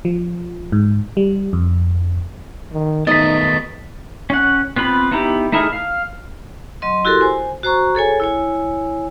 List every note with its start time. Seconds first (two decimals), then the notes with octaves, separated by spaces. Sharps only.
0.05 F3
0.72 G#2
1.17 G3
1.53 F2
2.72 D#3
3.07 D#3 A3 B3 D#4 D#5 A6 B6
4.30 C#4 F#5
4.76 B3 C4 F4 B5
5.12 B3 D#4 E4 G4
5.52 A3 D#4 E4 G#4 A#4
5.73 F5
6.82 F#3 D#5 C6
7.05 E4 F#4 G4 A4 A#4 C6
7.21 C5 G#5
7.63 F#4 C5 A#5 C#6
7.95 G#4 A4 C#5 G#5
8.20 E4 C#5 G#5